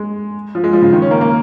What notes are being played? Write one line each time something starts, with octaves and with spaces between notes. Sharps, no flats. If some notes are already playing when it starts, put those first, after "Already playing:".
Already playing: G#3
F3
G#3
F3
C#3
D#3
C#4
A#3
A#3